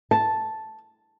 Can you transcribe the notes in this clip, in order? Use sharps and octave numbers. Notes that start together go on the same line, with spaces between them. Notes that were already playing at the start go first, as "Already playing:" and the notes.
A5